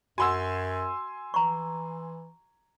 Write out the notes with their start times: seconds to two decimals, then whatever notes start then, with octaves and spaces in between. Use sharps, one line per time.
0.18 F#2 F#4 F#5 G#5 C6 E6
1.34 E3 A#5 C#6